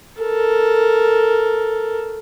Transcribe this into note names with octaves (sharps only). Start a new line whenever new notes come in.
A4 A#4